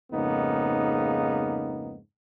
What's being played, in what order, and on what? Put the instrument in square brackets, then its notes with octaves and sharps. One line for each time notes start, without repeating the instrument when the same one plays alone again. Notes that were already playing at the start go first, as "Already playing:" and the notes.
[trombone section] F2 G#2 C#3 A#3 B3 D#4